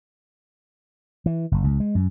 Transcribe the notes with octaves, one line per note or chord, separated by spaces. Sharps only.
E3
F#1
C#2
G#3
F#2